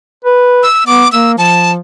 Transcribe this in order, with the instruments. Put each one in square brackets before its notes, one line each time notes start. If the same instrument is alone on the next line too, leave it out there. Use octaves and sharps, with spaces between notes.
[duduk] B4
[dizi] E6
[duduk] B3 [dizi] D6
[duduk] A#3 [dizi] E6
[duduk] F3 [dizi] A5